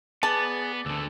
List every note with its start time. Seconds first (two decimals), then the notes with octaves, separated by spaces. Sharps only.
0.23 B3 G#4 B4 D5 A5
0.86 D2 D3 E6